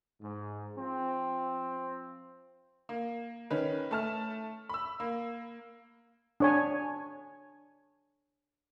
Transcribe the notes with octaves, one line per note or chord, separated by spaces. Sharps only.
G#2
F3 C4
A#3
D#3 C#4 B4
A3 A5 F6
B5 E6
A#3
D4 C#5 G#5